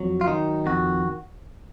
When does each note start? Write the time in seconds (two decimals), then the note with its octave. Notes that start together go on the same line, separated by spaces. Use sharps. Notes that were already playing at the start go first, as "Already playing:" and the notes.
Already playing: F2 F#3
0.21 F4
0.27 D#3 D#4
0.66 F2 F#4